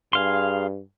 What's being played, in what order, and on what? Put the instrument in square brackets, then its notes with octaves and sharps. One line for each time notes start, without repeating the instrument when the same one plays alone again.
[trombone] G2 [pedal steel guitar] G#4 F5 C6